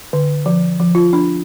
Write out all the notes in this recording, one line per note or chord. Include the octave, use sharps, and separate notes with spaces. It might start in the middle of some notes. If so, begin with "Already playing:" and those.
D3
F3
F3
F4
D4